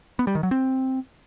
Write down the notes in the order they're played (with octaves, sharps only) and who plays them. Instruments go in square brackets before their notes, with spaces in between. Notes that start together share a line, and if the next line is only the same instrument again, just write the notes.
[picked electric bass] B3
G3
D#3
F#3
C4